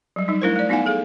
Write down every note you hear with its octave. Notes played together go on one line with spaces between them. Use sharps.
F#3 G3
G3 D#4
A3 D4 E4 A#4 C5
A3 D5
B3 D#4 F4 F5 F#5 G#5
G#4 A4 F5